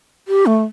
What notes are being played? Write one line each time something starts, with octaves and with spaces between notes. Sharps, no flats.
G4
A3